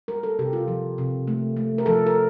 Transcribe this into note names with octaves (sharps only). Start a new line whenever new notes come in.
G3 A#4
A4
C3 G4
F4
F3
C3
A3
A3
A#4
F3 A4
A#4